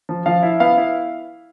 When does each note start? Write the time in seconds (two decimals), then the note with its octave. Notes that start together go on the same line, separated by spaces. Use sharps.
0.09 F3
0.26 F3 F5
0.43 E4
0.60 B3 F5
0.77 E4